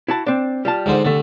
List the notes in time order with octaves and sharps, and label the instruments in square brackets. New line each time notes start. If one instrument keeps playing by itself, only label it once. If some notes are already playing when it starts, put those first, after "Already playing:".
[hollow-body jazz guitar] E4 F#4 A5
C4 D4
G3 F4 A5
[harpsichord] G#2 D3 C5
[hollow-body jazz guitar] C2 A3 [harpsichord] D3